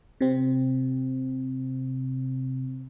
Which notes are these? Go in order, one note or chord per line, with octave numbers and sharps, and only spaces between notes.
C3 C4